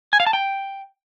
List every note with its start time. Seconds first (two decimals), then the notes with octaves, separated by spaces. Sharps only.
0.13 G#5
0.20 F5
0.27 A5
0.33 G5